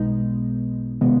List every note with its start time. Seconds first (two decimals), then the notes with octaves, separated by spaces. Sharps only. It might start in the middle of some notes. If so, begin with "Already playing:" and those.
Already playing: B1 B2 G#3 B3 D#4
1.01 C3 D#3 G#3 B3